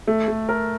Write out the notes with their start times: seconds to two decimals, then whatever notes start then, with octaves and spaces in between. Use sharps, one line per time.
0.07 A3
0.28 A3
0.49 A#4